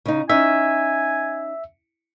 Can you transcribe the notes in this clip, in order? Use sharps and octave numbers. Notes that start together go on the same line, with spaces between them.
C#3 D#4
C#4 D#4 E5 G#5